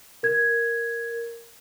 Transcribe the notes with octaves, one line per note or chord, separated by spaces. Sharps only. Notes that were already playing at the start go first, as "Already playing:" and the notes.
A#4 G#6